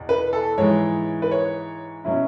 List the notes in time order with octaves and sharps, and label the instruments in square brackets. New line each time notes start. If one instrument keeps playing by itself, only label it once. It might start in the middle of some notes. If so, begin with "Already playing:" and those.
Already playing: [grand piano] E2 B2
B4
A4
G#2 E3 G#3 C#5
B4
C#5
B2 F#3 C#4 E4